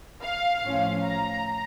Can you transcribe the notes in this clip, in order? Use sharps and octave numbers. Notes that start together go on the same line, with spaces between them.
F5
A2 F3 C#4
A#5